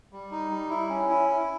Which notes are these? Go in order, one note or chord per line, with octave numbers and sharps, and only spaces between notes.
G3
D#4
G3
E4
C#4
E4
E4